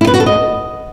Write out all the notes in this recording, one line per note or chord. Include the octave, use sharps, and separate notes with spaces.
E4
B4
F#4
A4
D#5